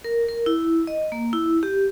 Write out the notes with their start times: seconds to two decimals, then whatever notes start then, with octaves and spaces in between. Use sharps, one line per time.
0.04 A#4
0.29 A#4
0.46 E4
0.87 D#5
1.12 A#3
1.33 E4
1.63 G4